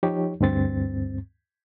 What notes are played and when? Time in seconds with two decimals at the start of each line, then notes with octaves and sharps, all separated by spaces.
0.03 F3 D#4 G4 C#5
0.40 D2 G2 C4 A6